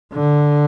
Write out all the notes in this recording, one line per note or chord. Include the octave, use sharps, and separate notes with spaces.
D3